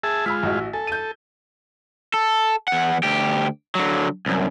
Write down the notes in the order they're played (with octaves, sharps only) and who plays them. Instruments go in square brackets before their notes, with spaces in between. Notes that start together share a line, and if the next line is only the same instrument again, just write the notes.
[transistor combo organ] G#4 E5 A5
[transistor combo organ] G#3 F4 [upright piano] B5 E6 B6
[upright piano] A1 F#4 D#5
[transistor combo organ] A4 [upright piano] G#5
[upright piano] G6 D#7
[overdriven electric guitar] A4
E2 F#5
D2 G4
D3 F#3
C2 F#2